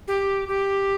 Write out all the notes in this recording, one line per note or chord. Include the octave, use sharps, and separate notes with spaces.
G4
G4